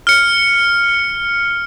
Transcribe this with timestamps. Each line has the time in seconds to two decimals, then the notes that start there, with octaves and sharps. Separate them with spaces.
0.07 F6 C#7